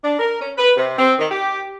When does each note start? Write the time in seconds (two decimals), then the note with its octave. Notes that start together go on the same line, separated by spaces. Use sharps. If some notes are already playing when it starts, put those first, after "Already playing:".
0.03 D4
0.18 A#4
0.39 C#4
0.57 B4
0.75 C3
0.96 C4
1.19 D#3
1.30 G4